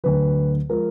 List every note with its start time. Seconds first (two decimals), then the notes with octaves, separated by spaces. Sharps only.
0.04 D2 D3 F#3 B4
0.70 F3 G#3 A#4